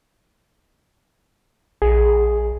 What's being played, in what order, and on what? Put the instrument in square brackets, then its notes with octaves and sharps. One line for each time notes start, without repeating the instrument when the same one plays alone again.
[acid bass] A#1 [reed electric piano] G#4